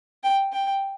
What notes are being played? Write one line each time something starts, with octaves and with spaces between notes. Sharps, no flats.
G5
G5